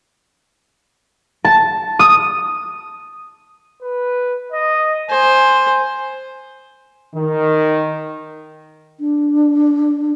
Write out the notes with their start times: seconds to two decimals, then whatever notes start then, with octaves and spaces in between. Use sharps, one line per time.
1.44 A5
1.99 D#6
3.82 B4
4.52 D#5
5.09 C5 G#5
7.15 D#3
9.00 D4